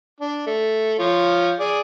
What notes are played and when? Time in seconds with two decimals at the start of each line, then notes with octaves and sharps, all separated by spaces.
0.20 D4
0.46 A3
0.99 F3 F4 C#5
1.59 G#4 D5